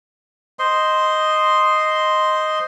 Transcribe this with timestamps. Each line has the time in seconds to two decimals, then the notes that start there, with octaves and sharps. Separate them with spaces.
0.59 C5 D#5 C6